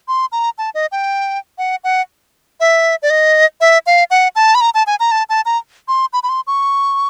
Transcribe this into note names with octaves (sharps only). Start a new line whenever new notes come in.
C6
A#5
A5
D#5
G5
F#5
F#5
E5
D5
D#5
E5
F5
F#5
A5
B5
A#5
A5
G#5
A#5
A5
A5
A#5
C6
B5
B5
C6
C#6